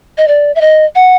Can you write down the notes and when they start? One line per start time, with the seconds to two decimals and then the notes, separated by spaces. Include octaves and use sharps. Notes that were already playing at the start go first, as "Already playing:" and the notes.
0.18 D#5
0.28 D5
0.55 E5
0.61 D#5
0.95 F#5